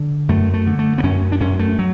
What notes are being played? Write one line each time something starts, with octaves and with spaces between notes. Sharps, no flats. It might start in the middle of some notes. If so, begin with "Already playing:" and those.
Already playing: D3
F#2 A3
A3
D3
A3
B3
F#2 C#4
D4
F#2 C#4
A3
F#3